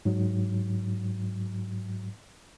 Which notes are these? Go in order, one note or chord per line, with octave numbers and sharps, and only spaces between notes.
G#2 F#3